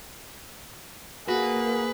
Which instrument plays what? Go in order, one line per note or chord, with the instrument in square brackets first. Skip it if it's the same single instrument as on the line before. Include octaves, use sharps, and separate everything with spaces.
[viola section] A#3 [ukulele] F#4 [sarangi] G#4 [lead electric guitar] B4